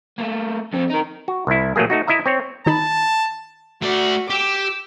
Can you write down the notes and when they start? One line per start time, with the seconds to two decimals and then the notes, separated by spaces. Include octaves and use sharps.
0.18 A3 A#3
0.73 F2 C4
0.90 D#4 A#4
1.28 F#4
1.47 C2 E4
1.76 A#1 F#3 A3 A#3 G#4
1.90 A3 D#4 F#4
2.07 E4 D#5 E5 A#5
2.26 C4 C#5
2.66 D#3 D#4 A5 B5
3.82 A3 F#4 D5
4.30 G4 D6 E6